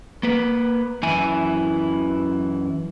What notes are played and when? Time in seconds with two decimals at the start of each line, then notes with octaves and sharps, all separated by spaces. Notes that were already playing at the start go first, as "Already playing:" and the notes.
0.23 A#3 B4
1.03 F#2 E3 E4 G#5